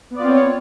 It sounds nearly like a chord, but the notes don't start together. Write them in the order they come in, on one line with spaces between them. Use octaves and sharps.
B3 D5 F4 C4 C#5